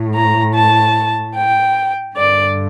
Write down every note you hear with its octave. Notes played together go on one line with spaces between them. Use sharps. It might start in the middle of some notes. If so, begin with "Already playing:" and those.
Already playing: A2
A#5
A5
G5
G2 D3 D5